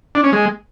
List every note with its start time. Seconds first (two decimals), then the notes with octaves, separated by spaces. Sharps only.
0.15 D4
0.24 C#4
0.32 G#3